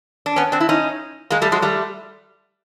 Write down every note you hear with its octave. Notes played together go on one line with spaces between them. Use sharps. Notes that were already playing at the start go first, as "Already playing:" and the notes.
D4
B3 C#4
C4 D4
E4
C#4 D#4
G#3 A#3
G3 A3
F#3 G#3
G3 A3